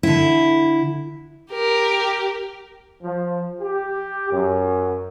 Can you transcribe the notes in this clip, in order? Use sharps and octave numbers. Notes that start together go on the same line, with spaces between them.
D3 E4
G4 A#4
F3
G4
F#2